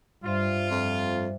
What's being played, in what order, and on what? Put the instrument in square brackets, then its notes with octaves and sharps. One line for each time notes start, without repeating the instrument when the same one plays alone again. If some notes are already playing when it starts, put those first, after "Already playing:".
[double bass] G2 [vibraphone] G3 C5 E5 [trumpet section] F4
[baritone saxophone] F2